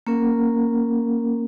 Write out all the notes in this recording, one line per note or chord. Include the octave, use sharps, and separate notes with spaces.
A#3 C#4 A#4